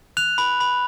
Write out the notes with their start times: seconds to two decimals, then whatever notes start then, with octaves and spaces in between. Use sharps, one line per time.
0.17 F#6 F7
0.38 B5
0.60 B5